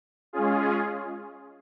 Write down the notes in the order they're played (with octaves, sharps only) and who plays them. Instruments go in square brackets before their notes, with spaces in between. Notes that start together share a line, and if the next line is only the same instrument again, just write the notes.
[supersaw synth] G#3 C#4 F4 G#4